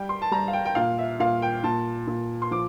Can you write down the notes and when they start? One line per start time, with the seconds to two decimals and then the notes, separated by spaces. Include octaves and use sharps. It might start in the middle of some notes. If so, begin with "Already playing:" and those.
Already playing: G3 G5
0.09 C6
0.22 A5
0.31 G3 A#5
0.48 F5
0.53 G5
0.65 G5
0.75 A#2 F5
0.98 E5
1.20 A#2 F5
1.42 G5
1.64 A#2 A5
2.07 A#2
2.42 C6
2.51 F3 D6